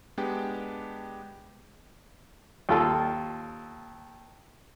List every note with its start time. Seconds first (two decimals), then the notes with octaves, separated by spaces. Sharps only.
0.18 G#3 B3 D4 G4 D5 G5
2.69 D#2 F4 A4